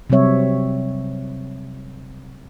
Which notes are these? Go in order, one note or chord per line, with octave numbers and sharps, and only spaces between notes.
C3 F#3 G3 C4 C#5 E5